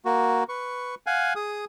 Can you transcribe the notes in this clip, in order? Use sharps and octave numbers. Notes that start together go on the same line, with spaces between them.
A#3 F#4
B4 C#6
F5 F#5 G#5
G#4 D#6